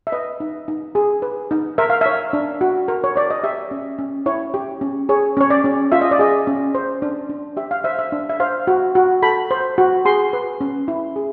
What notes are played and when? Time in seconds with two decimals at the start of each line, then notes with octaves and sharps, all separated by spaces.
0.07 E5
0.12 B4 D#5
0.40 D#4
0.68 D#4
0.95 G#4
1.22 B4
1.51 D#4
1.78 A#4 E5
1.90 F5
2.01 C#5 E5
2.33 D4
2.61 F#4
2.88 A#4
3.04 C#5
3.16 C#5 D5
3.30 D#5
3.43 G4 E5
3.71 C#4
3.99 C#4
4.26 E4 C#5
4.54 G4
4.81 C#4
5.09 G#4 C#5
5.37 C#4 C#5
5.50 D5
5.64 C#4
5.92 F4 E5
6.01 D#5
6.11 D5
6.19 G#4 D#5
6.47 C#4
6.75 C5
7.02 D4
7.29 D4
7.57 G4 E5
7.71 F5
7.84 C5 E5
7.99 E5
8.12 D4
8.29 E5
8.40 C5 F5
8.67 F#4
8.95 F#4
9.22 A4 B5
9.51 C5
9.78 F#4
10.05 G#4 C6
10.33 B4
10.61 C#4
10.88 E4
11.16 G#4